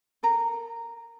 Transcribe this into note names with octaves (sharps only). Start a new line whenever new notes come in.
A4 A#4 A#5